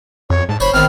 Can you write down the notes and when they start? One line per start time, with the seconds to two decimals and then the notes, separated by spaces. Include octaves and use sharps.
0.30 F2 C#5
0.49 G#2 A5
0.60 F#1 C5 C#5 B5
0.74 A1 D#3 B3 C4 F6